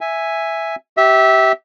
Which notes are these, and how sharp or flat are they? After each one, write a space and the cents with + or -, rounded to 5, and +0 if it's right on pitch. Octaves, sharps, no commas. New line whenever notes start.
E5 +0 G#5 -5
G4 -20 E5 -15